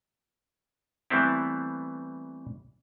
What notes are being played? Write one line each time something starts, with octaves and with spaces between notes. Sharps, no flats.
E3 G3 A3 B3 C4 E4